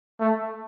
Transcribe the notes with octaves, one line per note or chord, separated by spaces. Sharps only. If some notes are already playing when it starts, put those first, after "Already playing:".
A3